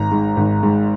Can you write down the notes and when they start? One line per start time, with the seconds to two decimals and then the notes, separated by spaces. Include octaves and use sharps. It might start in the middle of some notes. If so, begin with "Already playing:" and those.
Already playing: G#1 A#5
0.11 G#2
0.37 G#1
0.63 G#2